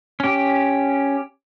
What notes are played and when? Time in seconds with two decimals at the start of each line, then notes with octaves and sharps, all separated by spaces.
0.20 C#4 G4